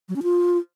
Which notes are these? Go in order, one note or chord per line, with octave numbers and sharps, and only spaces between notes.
F#3
C#4
F4